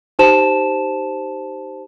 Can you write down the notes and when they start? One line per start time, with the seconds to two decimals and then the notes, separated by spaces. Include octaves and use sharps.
0.19 D#4 G4 C5 A5 E7